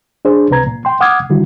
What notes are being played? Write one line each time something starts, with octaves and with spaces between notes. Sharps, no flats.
D4 G#4 C5
C#2 C3 B4 A#5 G#6
A#2
G5 C6
F#5 D6 D#6 F6 G#6
D3 D#3 G3 E4 F#4